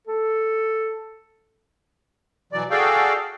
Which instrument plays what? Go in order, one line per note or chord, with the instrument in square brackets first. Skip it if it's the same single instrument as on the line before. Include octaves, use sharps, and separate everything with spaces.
[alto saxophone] A4
[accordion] B2 E3 F#3 D5
F#4 G#4 A4 D5 F5 G5